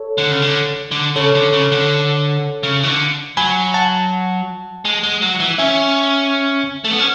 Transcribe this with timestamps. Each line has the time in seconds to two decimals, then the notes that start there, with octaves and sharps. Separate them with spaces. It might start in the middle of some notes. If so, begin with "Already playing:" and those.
Already playing: A4 C#5
0.18 D3
0.32 C#3
0.42 D3
0.91 D3
1.16 C#3 A4 C#5
1.35 D3
1.53 C#3
1.72 D3
2.63 C#3
2.83 E3
2.88 D3
3.37 F#3 G#5 B5
3.74 F#5 A5
4.85 G#3
5.03 G#3
5.22 F#3
5.40 E3
5.58 C#4 E5 G#5
6.84 A3
6.91 B3
6.99 C#4